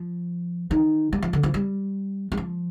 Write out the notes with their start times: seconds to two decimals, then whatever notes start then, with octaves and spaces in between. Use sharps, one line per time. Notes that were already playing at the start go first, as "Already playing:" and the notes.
Already playing: F3
0.71 D#3
1.13 G3
1.22 F3
1.33 D3
1.43 F3
1.54 G3
2.32 G3
2.37 F3